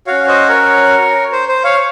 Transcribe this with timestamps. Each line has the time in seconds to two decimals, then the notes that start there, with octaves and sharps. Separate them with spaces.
0.07 C#4 F#4 C#5 F5
0.28 C5 D#5
0.49 A#4 C#5
1.32 C5
1.49 C5
1.64 C#5 F5